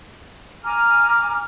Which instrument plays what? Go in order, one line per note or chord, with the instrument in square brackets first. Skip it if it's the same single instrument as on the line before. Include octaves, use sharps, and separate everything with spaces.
[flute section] G#5 A#5 D6 F6